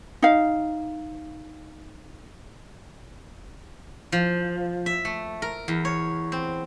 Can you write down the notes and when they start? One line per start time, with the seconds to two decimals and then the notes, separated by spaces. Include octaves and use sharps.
0.22 D#4 F5
4.12 F3
4.86 E5
5.05 A3
5.42 A#4
5.68 E2
5.85 C#5
6.32 C4